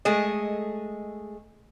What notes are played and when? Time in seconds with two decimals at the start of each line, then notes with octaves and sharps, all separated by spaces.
0.05 G#3 A3 G#4 D#5